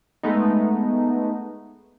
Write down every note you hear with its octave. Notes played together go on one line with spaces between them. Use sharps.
G#3 A3 B3 D#4